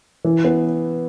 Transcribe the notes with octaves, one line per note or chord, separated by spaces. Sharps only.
E3
B3